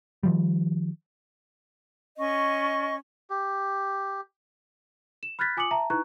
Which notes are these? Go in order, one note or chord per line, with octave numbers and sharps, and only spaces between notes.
D#3 F3 G3
C#4 D#5 C#6
G4
E7
B5 F6 F#6 G#6 A6 B6
F4 G#5 D6 D#6 C#7 F#7
E5 A5 A#5
D#4 E4 B4 A#5 C#6 F#6